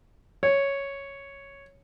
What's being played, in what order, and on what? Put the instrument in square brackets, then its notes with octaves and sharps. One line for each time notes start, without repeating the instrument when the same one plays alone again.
[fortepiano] C#5